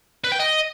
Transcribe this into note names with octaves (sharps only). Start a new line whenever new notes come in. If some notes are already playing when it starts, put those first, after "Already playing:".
B4
G5
D#5